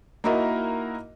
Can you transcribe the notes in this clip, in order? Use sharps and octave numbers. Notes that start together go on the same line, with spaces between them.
A#3 D#4 E4 F#4 A#4 D#5